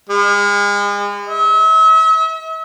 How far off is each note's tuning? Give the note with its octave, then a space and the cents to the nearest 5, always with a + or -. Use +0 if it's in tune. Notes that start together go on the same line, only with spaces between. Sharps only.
G#3 -40
E5 -40